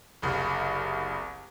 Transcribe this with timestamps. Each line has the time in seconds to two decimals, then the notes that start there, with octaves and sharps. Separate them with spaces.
0.22 F#1 C2